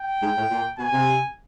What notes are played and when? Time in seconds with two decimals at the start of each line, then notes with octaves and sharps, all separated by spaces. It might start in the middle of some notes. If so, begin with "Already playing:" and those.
Already playing: G5
0.21 G#2
0.36 A2
0.50 A#2
0.78 B2 G#5
0.92 C3